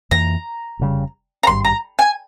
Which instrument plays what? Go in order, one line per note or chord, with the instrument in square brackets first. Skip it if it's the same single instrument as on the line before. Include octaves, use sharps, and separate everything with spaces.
[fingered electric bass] F2 E3 A#3 [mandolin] A#5
[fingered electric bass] F1 E2 C#3 G3
[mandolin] A#5
[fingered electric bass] G#1 G2 G3 [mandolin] C6
[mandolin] A#5
G#5